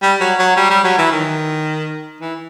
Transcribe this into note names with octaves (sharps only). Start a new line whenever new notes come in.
G3
F#3
F#3
G3
G3
F#3
E3
D#3
E3